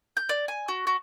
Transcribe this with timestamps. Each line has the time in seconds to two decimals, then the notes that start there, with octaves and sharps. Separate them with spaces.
0.17 G6
0.29 D5
0.48 G#5
0.68 F#4
0.87 F#4